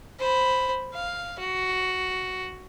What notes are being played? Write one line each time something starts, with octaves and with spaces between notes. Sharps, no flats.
C5 B5
F5
F#4